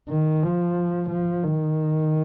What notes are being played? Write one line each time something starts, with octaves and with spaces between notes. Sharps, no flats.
D#3
F3
F3
D#3